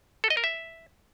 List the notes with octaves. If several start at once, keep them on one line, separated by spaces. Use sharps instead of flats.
A4
D#5
A#4
E5